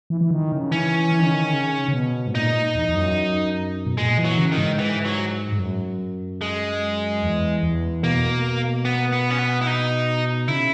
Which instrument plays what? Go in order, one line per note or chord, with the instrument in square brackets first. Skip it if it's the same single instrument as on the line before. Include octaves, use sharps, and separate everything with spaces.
[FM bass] E3
E3
D#3
C#3
[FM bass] E3 [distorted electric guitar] C#4
[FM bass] E3
D#3
C#3
D#3
C#3
C#3
B2
G#2
[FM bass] A#2 [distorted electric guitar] D#4
[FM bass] E2
E2
F#2
B2
[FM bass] A#2 [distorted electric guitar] G#3
[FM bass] E3
[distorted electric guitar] F#3
[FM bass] C#3
[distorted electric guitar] D#3
[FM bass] G#2
[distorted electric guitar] E3
F#3
[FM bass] G#2
F#2
[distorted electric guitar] G#3
[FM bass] E2
E2
[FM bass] B2 [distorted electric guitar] A#3
[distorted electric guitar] B3
B3
C#4
B3
E4
D#4
[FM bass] C#3 [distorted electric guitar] E4